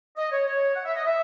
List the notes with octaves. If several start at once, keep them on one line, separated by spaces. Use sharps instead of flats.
D#5
C#5
C#5
F#5
E5
D#5
E5